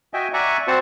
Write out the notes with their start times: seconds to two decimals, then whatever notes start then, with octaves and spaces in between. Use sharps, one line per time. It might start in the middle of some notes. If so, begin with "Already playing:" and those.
0.14 F#4 D#5 E5 G5 G#5
0.34 D5 E5 F#5 G#5 A#5 C#6
0.68 C4 F#4 C5 F#5 A5